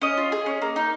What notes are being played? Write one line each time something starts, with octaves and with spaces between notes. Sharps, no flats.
C#4 D#5
F4
G#4
C#4
A#3
D#4